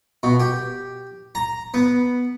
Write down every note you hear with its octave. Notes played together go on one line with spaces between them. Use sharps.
B2
G4
A#5
B3